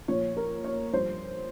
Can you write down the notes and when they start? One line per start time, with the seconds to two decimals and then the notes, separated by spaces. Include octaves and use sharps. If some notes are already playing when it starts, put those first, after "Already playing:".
0.08 A#2 F3 C#5
0.37 A#4
0.64 C#5
0.93 G2 F3 C5